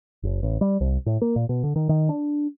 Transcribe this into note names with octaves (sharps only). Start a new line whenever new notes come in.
F#1
A1
G3
C2
A2
A#3
A#2
B2
D3
D#3
D#3
D4